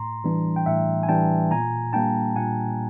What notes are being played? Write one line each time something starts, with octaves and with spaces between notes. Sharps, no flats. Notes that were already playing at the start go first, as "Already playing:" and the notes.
Already playing: A2 A#5 C6
E3 G3 B3 D4
G5
A2 E5 F#5
G#5
E3 G3 B3 D4 G5 A5
A#2 G#5 A#5
G3 A#3 D4 G5 A5
A#2 F#5 G#5